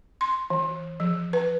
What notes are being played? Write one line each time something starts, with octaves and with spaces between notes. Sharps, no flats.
C6
E3
F3
B4